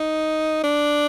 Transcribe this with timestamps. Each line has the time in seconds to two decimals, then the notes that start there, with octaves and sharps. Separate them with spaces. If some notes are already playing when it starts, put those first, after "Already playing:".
Already playing: D#4
0.64 D4